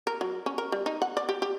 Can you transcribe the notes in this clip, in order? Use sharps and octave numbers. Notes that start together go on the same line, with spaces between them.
A#4
F#3
C#4
A#4
G3
D#4
F#5
D5
G4
G4